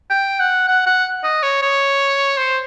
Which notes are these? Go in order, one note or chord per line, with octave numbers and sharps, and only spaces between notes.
G5
F#5
F#5
F#5
D#5
C#5
C#5
C5